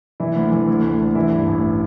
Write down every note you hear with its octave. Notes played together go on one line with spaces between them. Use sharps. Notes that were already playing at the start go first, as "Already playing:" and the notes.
E3 E4
D2
E3
D2
D2
D2
E3 E4
G2
A1